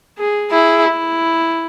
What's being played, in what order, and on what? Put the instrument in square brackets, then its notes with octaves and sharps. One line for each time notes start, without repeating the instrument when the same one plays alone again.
[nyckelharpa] G#4
[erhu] E4 [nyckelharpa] G#4
[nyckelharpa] E4